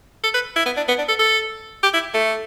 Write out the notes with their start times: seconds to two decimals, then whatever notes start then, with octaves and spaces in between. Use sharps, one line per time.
0.24 A4
0.34 B4
0.56 E4
0.66 B3
0.77 D4
0.88 B3
0.98 D4
1.08 A4
1.19 A4
1.83 G4
1.93 E4
2.14 A3